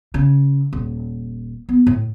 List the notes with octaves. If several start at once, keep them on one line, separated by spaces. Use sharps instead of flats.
C#3
D#1
B3
A2